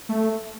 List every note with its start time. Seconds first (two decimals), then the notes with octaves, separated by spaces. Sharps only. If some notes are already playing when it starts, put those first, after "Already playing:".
0.09 A3